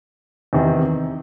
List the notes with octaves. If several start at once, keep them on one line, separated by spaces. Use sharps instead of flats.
E2 C3 D#3